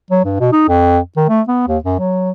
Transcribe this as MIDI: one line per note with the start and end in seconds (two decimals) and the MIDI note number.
0.11 0.22 54
0.25 0.36 43
0.40 0.50 47
0.53 0.65 63
0.68 0.99 41
1.17 1.24 51
1.29 1.41 57
1.48 1.63 59
1.68 1.78 39
1.84 1.98 42
1.99 2.31 54